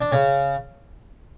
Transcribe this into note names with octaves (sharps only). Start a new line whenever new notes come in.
D4
C#3 C#4